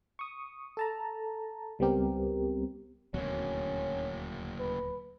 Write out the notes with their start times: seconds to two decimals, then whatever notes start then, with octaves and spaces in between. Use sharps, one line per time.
0.19 C#6 D#6
0.77 A4 A5 A#5
1.79 C#2 G3 B3 C4 G4 A#4
3.14 D#1 D2 B2 F#3 A#3 C#4
4.59 B4